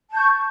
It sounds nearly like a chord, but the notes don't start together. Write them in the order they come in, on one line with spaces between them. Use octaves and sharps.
A5 G6 C#6